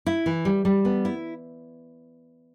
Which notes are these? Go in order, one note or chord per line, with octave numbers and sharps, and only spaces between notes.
E4
E3
G3
G3
B3
E4